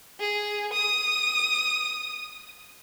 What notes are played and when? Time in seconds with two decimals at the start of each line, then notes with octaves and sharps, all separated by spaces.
0.20 G#4
0.73 D#6